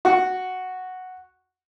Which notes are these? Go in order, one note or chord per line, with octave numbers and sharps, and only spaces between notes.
F#4 F#5